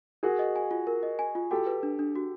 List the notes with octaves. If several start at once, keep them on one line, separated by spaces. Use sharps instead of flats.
F#4 G#4 A#4
D#5
G#5
F4
A#4
D#5
G#5
F4
F#4 G4 A4
B4
D4
D4
F#4